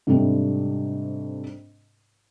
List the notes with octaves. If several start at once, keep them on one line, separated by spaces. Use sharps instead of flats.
G#2 C3 G3 A3 C4 D4